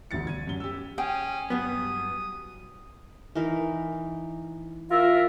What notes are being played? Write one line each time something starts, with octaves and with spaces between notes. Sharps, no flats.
E1 D2 G3 A6 C#7
G#6 D#7
F#2 G7
G4 E6
C#4 G#4 G5
G2 F#3 B3 D#6
E3 D#4 A#4
F4 A#4 E5